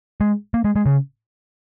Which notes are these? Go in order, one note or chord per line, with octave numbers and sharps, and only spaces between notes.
G#3
A#3
G#3
G#3
C#3